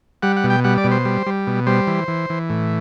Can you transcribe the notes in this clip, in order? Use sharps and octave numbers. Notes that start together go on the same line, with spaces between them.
G3 F#5
F#5
B2
G5
G3 F#5
D5
B2
C5
G3
G3
B2
G3 C5
E3
E3
E3
A2